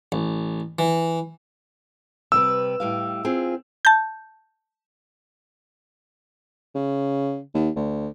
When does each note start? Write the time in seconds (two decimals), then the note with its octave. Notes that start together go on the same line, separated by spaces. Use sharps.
0.12 A1
0.79 E3
2.32 C3 G3 B4 E6
2.80 A2 G3 F5
3.25 C4 F4 G#4
3.85 A5 G6
6.75 C#3
7.54 D#2
7.76 D2